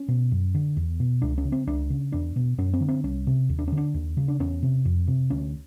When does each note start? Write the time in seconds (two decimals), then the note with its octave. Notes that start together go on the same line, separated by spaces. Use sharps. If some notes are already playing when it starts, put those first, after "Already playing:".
Already playing: C#4
0.08 B2
0.32 F#2
0.54 D3
0.77 E2
1.00 B2
1.22 C#2 D4
1.38 C#4
1.45 C#3
1.52 C4
1.67 C#2 D4
1.90 C#3
2.12 E2 D4
2.36 B2
2.58 F#2 C#4
2.73 C4
2.81 D3
2.88 C4
3.03 C2 C#4
3.27 C3
3.49 D#2
3.58 D4
3.68 C#4
3.72 D3
3.77 D4
3.94 D#2
4.17 C#3
4.28 D4
4.39 E2 C#4
4.63 C3
4.85 F2
5.07 C3
5.30 D2 C#4